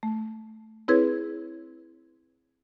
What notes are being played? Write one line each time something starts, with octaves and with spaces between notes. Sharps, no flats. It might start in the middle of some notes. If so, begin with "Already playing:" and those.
A3
C4 E4 G#4 B4 C#5 G#6